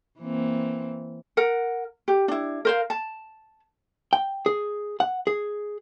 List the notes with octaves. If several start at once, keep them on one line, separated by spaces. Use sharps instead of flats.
E3 A#3 C4
A#4 F#5
G4
D4 E4
A#4 C5 F5
A5
G5
G#4
F#5
G#4